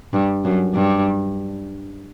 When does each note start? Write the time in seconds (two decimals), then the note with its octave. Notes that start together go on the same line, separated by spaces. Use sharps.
0.13 G2
0.44 F#2
0.74 G2